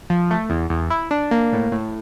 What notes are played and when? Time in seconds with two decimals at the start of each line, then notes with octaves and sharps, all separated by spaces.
0.10 F3
0.31 A3
0.50 E2
0.70 E2
0.90 E4
1.11 D4
1.31 A#3
1.53 A2
1.72 A2